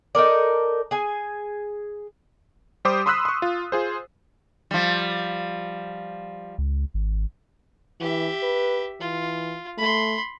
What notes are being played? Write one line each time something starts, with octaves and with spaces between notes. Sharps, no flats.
D#4 A4 A#4 D5
G#4 G#5
G3 G4 C5 D6 D#6
B5 C6 D#6 E6 F#6 B6
C6 C#6
F4
F4 G#4 C5
F3 G3
C#2
G#1
E3 G4 E5
B4
E3 F4
A3 B5 C6